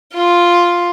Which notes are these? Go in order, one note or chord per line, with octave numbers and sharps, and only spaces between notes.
F4